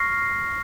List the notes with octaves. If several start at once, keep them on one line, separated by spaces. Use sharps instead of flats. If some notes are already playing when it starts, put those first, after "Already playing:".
Already playing: C#6 F6 A#6 C7